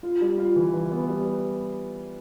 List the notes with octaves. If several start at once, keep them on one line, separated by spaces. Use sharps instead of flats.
F4
G3
F4
E3
E3
B3
G3